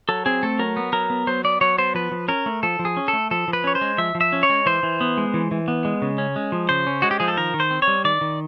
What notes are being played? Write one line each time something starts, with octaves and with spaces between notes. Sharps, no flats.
F#3 A4
C4 G#4
A3 A4
F#3 A#4
B3
F#3 A#4
B3
F#3 C5
B3 D5
F#3 C#5
B3 C5
F3 B4
F3
C#4 A#4
A3
F3 A4
F3
G#4
C#4
A4
A3
F3 A4
F3
B4
C#4 C#5
C5
G#3
F3 E5
F3
E5
C#4
C#5
G#3
E3 C5
E3
B3
G#3
E3
E3
B3
G#3
C#3
C#4
G#3
F3
C#3 C5
C#4
G#3 F#4
G4
F3 G#4
A4
D#3 A#4
D#3
C5
C4
C#5
G3
D#3 D5
D#3